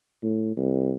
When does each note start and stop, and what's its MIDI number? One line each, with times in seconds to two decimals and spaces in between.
0.23 0.56 45
0.57 0.94 36